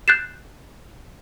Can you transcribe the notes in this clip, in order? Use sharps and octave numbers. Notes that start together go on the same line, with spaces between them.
F#6 G6 A6 C7 E7